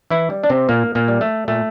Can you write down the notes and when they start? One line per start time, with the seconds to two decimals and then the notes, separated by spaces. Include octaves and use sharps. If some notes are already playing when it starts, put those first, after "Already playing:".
0.10 E3 E4
0.30 G3
0.44 D4
0.50 C3 C4
0.69 A#2 A#3
0.95 A#2 A#3
1.08 G3
1.21 A3
1.48 A#2 A3